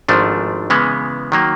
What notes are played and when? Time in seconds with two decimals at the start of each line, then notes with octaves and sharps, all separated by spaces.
0.08 G#1 G#2 F3 A3 D4
0.70 C#3 E3 G#3 B3
1.32 D#3 F#3 A#3